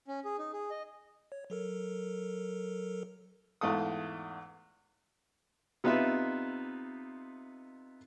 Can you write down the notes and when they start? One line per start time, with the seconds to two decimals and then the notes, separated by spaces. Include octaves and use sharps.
0.08 C#4
0.25 G#4
0.38 D#4
0.53 G#4
0.70 D#5
1.32 C#5
1.50 F#3 A4 A#4
3.61 E2 G#2 A3 F4 A4 D#6
5.84 C3 B3 D#4 F4 B4 E5